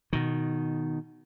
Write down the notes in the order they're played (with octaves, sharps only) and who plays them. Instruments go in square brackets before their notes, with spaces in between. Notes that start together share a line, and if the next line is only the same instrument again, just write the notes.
[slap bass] B2 D#3